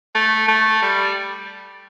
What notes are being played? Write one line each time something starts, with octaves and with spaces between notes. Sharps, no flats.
A3
A3
G3